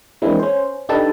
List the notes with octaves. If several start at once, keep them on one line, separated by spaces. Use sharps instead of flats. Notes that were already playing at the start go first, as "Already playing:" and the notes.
E3 G#3 A#3 C4 D4 E4
C#4 C5
D4 D#4 G4 A4 B4 A5